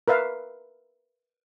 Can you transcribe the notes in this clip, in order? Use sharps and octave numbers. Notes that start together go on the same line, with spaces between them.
A#4 B4 E5 F5